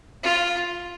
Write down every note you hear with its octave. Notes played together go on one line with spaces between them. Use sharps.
F4